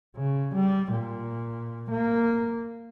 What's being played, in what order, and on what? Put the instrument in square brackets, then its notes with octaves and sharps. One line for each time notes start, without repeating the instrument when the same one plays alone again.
[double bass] C#3
G3
A#2
A#3